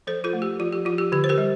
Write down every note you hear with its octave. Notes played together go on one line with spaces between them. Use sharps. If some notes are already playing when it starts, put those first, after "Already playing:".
F3 A4 C5
F4 A4
A3
G4
F3 F4
G4
F3 F4
G4
D3 G4
C5
G4 A#4
G3